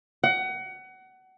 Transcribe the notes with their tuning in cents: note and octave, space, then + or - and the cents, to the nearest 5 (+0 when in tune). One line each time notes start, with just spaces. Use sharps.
F#5 +25